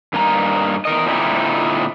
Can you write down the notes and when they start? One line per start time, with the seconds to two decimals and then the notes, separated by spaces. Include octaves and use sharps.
0.13 G2 A#3 D#4 G#5 A#5
0.85 E2 A#4 D#5
1.06 A#2 D3 C4 D#4 E4